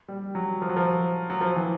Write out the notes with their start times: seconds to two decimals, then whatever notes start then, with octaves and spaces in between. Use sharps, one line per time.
0.08 G3
0.35 F#3
0.62 F3
0.69 F#3
0.76 F3
1.30 F#3
1.41 F3
1.56 E3